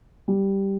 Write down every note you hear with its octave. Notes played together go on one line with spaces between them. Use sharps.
G3